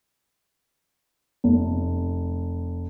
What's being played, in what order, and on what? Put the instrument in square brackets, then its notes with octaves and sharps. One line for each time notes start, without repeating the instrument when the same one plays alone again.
[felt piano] F1